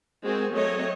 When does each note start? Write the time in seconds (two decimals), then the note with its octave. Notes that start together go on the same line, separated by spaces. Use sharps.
0.23 G#3 C4 F#4 G#4 A#4
0.54 F#3 A3 C4 C#5 D#5